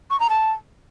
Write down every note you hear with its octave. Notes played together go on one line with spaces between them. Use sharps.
C#6
A#5
A5